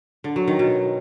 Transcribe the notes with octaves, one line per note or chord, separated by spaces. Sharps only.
D3
F#3
D#3
B2